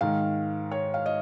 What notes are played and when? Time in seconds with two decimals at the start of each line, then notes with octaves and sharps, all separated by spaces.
0.01 G#2 D#3 F5
0.71 C#5
0.94 F5
1.06 D#5